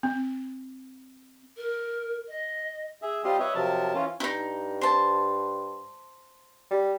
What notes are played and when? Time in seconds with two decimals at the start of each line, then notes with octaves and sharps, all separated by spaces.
0.03 C4
1.57 A#4
2.28 D#5
3.02 G#4 E5
3.24 G3 C4 F4 G4 D#5 C6
3.40 B4 C#5 D#5 E5
3.55 C3 F3 F#3 A#4 A5
3.94 E3 C#4 F4
4.20 G2 D#4 E4
4.81 C5 A5
6.70 G3